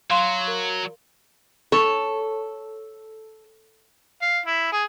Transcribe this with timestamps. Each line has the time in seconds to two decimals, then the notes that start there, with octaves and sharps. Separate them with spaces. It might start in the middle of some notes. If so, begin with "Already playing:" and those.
0.10 F#3 F5 C6
0.47 A#4
1.72 A4 C#5
4.22 F5
4.46 E4
4.72 G#4